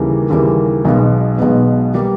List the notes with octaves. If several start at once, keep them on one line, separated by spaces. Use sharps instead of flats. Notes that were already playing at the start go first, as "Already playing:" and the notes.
Already playing: D#2 C#3 E3 G3 A#3
D#2 C#3 E3 G3 A#3
B1 B2 G#3 B3
B1 B2 G#3 B3
G3 A#3